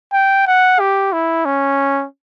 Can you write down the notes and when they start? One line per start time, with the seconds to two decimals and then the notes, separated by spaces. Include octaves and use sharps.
0.13 G5
0.47 F#5
0.79 G4
1.13 E4
1.45 C#4